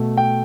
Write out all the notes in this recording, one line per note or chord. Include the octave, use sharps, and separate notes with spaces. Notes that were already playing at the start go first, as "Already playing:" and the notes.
Already playing: B2 A3
G5